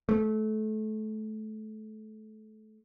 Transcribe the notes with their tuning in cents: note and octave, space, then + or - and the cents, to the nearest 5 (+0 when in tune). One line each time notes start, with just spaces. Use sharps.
A3 -25